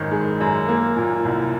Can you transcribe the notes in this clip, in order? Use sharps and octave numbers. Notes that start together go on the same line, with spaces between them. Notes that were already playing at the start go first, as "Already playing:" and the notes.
Already playing: G#1 F#2 D#3
G#3
F#2
A#3
A#2
C2